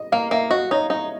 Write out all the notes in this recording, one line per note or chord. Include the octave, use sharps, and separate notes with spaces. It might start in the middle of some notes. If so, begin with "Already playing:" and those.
Already playing: D#5
A#3 F5
A#3 E5
F#4 D#5
D#4 C#5
D#4 D#5